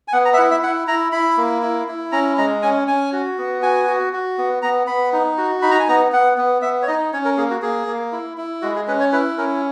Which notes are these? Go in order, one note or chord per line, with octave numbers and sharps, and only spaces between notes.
G#5
B3 F#5
A#5
E5
E4 F#5
E5
E4 F#5
E4 A#5
E4 B5
A#3
E4
E4
C#4 A#5
G#3 A#5
C#4 G#5
C#4 G#5
F#4
B3
F#4 G#5
F#4
F#4
B3
B3 A#5
B3 B5
D#4
F#4
D#4 B5
A#5
G#5
B3 A#5
B3 F#5
B3
B3 E5
C#5
D#4 D#5
C#4 C#5
A#4
A#3 G#4
F#4
A#3 G#4
A#3
E4
E4
G#3 F#4
G#4
C#4 B4
C#5
E4 B4
C#4 A#4